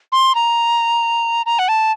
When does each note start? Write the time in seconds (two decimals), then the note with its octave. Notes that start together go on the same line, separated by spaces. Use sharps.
0.12 C6
0.35 A#5
1.46 A#5
1.59 F#5
1.68 A5